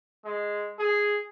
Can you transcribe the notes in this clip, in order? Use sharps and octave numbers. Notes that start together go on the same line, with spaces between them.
G#3
G#4